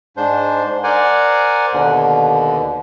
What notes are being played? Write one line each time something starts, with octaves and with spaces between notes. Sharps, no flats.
G#2 D4 C5
A#4 C5 D5 F#5 G#5
D#2 B2 D3